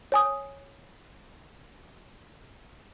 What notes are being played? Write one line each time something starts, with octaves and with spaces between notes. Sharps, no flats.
C#5 G#5 D#6